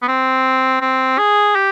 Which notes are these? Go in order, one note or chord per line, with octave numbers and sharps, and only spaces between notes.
B3
C4
C4
G#4
G4